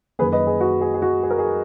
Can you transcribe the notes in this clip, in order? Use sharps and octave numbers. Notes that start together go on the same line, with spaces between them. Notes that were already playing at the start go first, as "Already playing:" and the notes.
F#2 D#3 A#3 G#4 B4
B4 D#5
G#4
F#4
G#4
G#4
F#4
G#4
A#4
G#4